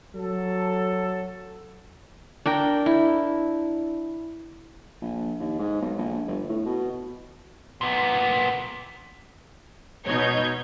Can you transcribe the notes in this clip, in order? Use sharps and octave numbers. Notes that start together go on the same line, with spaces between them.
F#3 A4
D4 A#4 G5
E4
A#1
D#2
G#2
B1
A#1
G1
A2
B2
A#2 B3
B2 D#4 C#5 G6 G#6